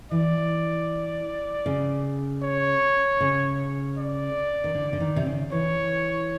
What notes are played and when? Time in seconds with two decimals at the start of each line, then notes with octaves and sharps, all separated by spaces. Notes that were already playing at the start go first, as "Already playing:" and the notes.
0.11 E3 D5
1.66 C#3
2.43 C#5
3.20 C#3
3.97 D5
4.64 D#3
4.75 D3
4.93 D3
5.00 D#3
5.16 C3
5.26 C#3
5.52 E3 C#5